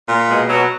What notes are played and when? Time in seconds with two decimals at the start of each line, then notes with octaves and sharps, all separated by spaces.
0.09 A#2
0.28 B2 G#3
0.48 B2 F#3